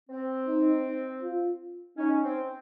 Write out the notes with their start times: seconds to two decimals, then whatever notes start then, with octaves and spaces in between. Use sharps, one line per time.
0.10 C4
0.47 D#4
1.22 F4
1.97 C#4 D#4
2.23 C4